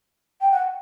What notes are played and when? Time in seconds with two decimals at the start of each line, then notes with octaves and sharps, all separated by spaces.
0.41 G5
0.51 F#5